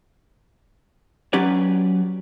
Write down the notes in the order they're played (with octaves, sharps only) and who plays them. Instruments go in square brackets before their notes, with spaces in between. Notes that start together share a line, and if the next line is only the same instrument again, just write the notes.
[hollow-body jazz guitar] F#3 C#4 G4 B4 D5